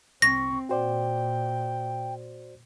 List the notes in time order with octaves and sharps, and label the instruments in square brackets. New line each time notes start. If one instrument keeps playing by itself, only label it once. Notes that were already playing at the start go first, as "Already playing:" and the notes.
[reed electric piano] C2 [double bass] C4 [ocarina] C#6 [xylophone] A#6
[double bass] A#2 [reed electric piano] F#4 C5 D5 [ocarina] G5